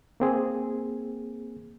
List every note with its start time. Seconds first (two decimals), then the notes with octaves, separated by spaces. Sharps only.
0.20 A#3 C4 G#4